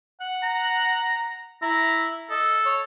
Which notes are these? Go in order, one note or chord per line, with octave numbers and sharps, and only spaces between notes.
F#5
A#5
E4 A#5
A4 D#5
C#5